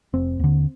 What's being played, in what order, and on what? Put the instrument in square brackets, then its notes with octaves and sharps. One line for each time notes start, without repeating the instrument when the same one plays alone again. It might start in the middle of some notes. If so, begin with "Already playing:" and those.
[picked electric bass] F1 C4
D#2 D3